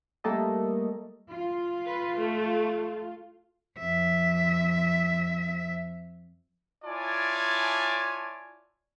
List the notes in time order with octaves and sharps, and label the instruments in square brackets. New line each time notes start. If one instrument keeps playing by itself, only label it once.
[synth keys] G3 A3 A#3 A4 D#5
[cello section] F4
[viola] B4
A3
[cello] F2 E5
[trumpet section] E4 F4 C#5 D5 G#5 A5